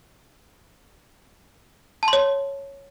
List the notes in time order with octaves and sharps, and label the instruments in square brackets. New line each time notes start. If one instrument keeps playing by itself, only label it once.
[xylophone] A5
C6
C#5